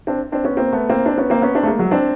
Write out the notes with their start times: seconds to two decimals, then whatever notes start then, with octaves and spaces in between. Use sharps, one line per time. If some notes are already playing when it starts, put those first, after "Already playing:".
0.07 C4 D4
0.32 C4 D4
0.44 B3 C#4
0.57 A#3 C4
0.72 A3 B3
0.90 A#3 C4
1.06 C4 D4
1.18 B3 C#4
1.30 A#3 C4
1.42 B3 C#4
1.55 C4 D4
1.63 A3
1.67 G#3 A#3
1.79 F#3 G#3
1.91 C4 D4